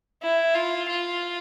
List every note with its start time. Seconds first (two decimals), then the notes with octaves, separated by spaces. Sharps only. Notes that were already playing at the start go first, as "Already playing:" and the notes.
0.23 E4
0.55 F4
0.89 F4